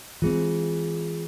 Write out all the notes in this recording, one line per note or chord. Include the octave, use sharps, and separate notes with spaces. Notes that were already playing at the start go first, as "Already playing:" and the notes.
E3 G#3 C4 F4 G#4